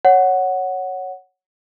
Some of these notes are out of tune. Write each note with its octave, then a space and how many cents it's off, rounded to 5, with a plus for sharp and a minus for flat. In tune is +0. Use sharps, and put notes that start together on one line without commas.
C#5 +0 F#5 +0